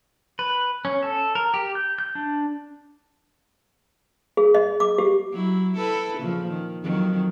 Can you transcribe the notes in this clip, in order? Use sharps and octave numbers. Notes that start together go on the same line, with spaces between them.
B4
C#4
A4
A#4
G4
G6
G6
D4
G#4
D#5
D6
G4
F#3 E4
E4 A4 B4
A#2 C#3 F3
D#3
F2 D#3 F#3